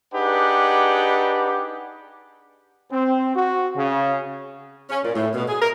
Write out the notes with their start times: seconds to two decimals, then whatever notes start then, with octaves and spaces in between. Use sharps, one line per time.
0.14 D4 D#4 G4 G#4 B4 F#5
2.92 C4
3.35 F#4
3.76 C#3
4.90 C#4
5.04 A#2
5.15 A2
5.34 B2
5.47 G#4
5.61 A#4